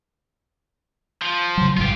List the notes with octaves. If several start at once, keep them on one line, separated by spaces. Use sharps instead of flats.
F3
C#3 F#3
A1 G2 F4 G4